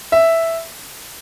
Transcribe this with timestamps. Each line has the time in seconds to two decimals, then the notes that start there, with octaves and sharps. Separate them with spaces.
0.12 E5